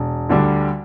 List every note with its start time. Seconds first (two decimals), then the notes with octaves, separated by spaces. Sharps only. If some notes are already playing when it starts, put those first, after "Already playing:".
Already playing: E1
0.29 D2 D3 G3 D4